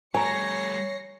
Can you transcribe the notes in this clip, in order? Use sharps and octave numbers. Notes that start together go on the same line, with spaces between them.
G3 A3 C#5 G#5 A#5 A#6 C7 C#7